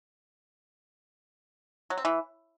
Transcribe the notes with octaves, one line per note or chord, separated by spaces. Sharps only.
F#3
C4
E3